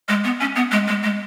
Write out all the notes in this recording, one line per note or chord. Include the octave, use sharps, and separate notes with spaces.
G#3
B3
C#4
B3
G#3
G#3
G#3